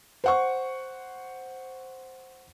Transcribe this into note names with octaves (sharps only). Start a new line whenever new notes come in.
C5 F#5 C#6